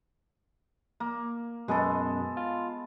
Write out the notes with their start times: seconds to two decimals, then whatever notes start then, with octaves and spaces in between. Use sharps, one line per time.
1.00 A#3
1.68 F#2 B2 G#3 B3 A4
2.37 F4